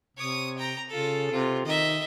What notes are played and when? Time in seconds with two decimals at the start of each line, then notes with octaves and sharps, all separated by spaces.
0.17 C3 C#5 D#6
0.57 G5 A#5
0.89 C#3 F4 A4
1.31 C3 F4
1.65 D#3 D#5 E5